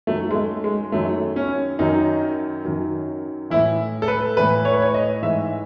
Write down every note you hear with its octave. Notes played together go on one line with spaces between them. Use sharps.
F#2 D#3 F#3 A3
G#3
A3
G#3
F#2 D#3 F#3 A3
C#4
F#2 D#3 F#3 D#4
F#2 D#3 F#3
A2 E3 E4
A4
B4
A2 E3 B4
C#5
B4
C#5
D#5
G#2 E3 E5